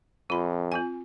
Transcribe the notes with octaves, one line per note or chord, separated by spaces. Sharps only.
F2 F4 B5
C4 F4 G#5